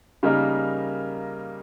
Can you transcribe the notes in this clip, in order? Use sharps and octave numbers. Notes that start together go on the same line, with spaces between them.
C#3 G3 A#3 D#4 A#4